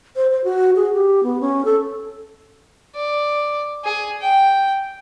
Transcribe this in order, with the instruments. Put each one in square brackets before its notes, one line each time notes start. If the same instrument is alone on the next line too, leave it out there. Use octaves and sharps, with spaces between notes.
[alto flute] C5
C5
F#4
G#4
G4
B3
C#4
A4
[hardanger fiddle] D5
G#4
G5